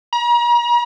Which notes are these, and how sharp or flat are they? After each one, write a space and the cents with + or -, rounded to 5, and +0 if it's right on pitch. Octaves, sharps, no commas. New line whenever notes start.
A#5 +40